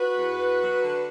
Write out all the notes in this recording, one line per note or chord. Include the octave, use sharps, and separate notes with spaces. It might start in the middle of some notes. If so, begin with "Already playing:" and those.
Already playing: F#4 B4
E2
E2
F#3
D3